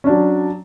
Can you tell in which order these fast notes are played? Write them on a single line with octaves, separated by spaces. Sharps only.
C#4 D4 F#3